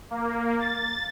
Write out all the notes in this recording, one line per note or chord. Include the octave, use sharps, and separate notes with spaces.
A#3
A6